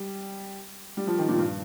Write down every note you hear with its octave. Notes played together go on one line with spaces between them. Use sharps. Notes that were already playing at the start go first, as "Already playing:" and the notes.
Already playing: G3
G3
F3
D#3
A#2
G2